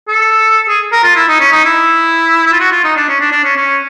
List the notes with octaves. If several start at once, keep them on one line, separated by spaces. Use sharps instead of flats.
A4
G#4
A#4
F4
E4
D#4
C#4
D#4
E4
E4
F4
F#4
F4
D#4
D4
C#4
D4
D4
C#4
C#4